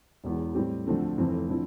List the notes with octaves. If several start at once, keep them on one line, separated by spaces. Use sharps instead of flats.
E1 E2 E3
A2 G3 C4 G4
D2 D3 F3 A3 C4
F1 F2 E3 A3 C4
D3 F3 C4 E4